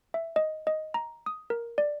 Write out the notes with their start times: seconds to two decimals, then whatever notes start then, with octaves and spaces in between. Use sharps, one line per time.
0.14 E5
0.36 D#5
0.67 D#5
0.94 A#5
1.26 D#6
1.50 A#4
1.78 D5